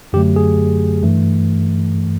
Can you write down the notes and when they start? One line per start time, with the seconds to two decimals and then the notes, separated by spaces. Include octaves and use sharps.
0.13 F#2 D3 F#3 A3 G4
0.36 G#4
1.03 G2 E3 A3